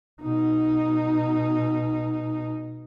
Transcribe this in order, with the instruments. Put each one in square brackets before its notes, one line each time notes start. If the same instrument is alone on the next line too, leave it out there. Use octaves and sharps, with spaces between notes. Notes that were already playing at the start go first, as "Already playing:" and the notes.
[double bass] B2 D#4